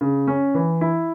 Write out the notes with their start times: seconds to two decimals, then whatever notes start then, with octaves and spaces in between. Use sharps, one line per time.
0.01 C#3
0.27 C#4
0.55 E3
0.81 E4